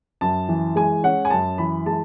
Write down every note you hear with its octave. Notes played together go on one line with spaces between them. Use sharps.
F#2 A5
E3
G#3 G#5
C#4 F#5
G#5
F#2 A5
E3 B5
G#3 A5